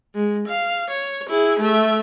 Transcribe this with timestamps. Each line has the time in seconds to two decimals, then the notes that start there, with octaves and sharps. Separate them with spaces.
0.15 G#3
0.47 F5
0.90 C#5
1.29 E4 G#4
1.59 A3 E5